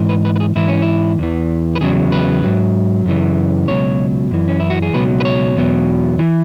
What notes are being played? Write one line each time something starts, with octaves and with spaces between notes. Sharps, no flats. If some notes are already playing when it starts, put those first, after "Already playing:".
Already playing: G#2 E3
B4
B4
B4
G#4
G#2 E3 E4
C#4
E4
E2 E3
B4
E2 C#3 F#3 G#4
B4
G#2 F#3
F#2 C#3 E3
C#2 B2 F#3 C#5
F#2 E3
C#4
E4
F#4
G#4
C#2 B2 F#3 B4
B4
C#5
E2 B2 F#3
E3